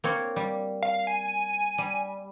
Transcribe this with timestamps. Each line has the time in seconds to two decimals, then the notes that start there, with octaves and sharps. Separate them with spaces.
0.04 A#3 C4 C#5
0.36 G3
0.83 F5
1.07 G#5
1.78 G3